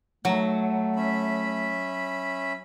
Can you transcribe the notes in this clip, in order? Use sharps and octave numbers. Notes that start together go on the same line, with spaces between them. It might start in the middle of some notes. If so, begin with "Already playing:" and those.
F#3 A3
C#4 E5 B5